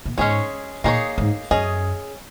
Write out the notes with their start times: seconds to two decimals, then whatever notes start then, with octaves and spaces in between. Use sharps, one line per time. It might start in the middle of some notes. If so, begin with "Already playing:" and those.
0.05 A#2
0.18 G#2 G#3 C#4 G#4 C#5
0.84 A#2 A#3 D#4 G#4 C#5
1.18 G#2
1.51 F#2 C#4 G#4 D#5